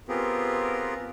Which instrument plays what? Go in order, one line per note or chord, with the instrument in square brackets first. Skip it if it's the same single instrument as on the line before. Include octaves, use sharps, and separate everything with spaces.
[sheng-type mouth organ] B3 C4 F4 G4 G#4 A#4